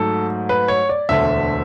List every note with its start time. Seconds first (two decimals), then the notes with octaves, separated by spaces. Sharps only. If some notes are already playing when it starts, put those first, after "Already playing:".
Already playing: G#2 F#3 A3 A4
0.49 B4
0.68 C#5
0.89 D5
1.09 E1 D2 D3 A3 E5